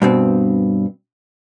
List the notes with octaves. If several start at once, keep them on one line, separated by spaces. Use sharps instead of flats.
G2 B2 C4